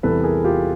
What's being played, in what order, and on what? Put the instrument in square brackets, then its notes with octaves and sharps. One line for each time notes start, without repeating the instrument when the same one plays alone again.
[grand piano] E2 C3 E3 G3 A4 B4
G#4 A#4
F4 G4